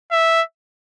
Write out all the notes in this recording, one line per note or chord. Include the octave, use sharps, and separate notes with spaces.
E5